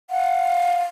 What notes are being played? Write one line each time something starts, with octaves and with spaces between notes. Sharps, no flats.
F5 F#5